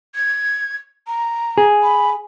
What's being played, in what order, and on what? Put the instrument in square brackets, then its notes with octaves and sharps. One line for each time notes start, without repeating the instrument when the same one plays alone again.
[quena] G#6
A#5
[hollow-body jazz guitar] G#4
[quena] B5